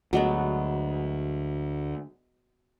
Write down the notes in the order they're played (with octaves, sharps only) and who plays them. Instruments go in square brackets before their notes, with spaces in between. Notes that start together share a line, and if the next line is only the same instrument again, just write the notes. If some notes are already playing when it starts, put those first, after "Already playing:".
[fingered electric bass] D2 [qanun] F#3 G#3 B3